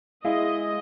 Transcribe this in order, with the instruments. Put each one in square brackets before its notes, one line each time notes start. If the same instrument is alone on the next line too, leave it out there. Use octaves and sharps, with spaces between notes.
[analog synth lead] G#3 [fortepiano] E4 [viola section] D#5 [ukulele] F5